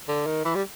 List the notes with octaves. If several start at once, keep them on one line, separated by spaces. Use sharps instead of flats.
D3
D#3
E3
G3